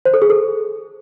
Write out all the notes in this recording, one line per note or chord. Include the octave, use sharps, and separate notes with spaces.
C5
A4
G#4
A4